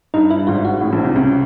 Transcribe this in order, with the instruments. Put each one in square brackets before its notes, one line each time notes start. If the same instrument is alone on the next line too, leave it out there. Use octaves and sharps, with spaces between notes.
[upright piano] G2 [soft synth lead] D#4
[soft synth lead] E4
[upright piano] G2
[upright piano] G#1 G#2 [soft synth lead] F4
[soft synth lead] F#4
[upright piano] A1 A2
A#1 A#2
C2 C3
C#2 C#3